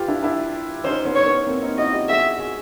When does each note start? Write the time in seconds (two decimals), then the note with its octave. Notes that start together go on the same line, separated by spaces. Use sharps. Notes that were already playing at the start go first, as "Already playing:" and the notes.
Already playing: F4 G4 B4
0.08 D4 E4
0.23 D4 E4
0.84 C#4 D#4 C5
1.05 B3 C#4
1.15 C#5
1.26 B3 C#4
1.47 A#3 C4
1.63 C#4 D#4
1.78 E4 F#4 D#5
1.93 F4 G4
2.09 F#4 G#4 E5
2.39 F#4 G#4